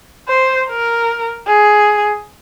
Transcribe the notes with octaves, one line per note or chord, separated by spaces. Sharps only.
C5
A#4
G#4